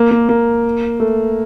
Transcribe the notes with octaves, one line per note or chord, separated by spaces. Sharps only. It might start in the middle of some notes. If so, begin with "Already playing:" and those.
Already playing: A#3
A#3
A#3
A3